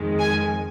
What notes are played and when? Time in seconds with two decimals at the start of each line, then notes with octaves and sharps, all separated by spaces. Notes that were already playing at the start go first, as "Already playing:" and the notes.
Already playing: F2 D#3 G#3
0.20 G#5